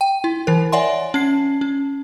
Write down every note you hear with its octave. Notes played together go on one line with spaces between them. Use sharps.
G5
E4
E3 A#4
C#5 D5 E5 F#5 G#5 C6
C#4 C7
C#4